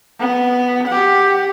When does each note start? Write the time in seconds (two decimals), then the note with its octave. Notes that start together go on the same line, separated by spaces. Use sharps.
0.19 B3
0.87 G4 F#5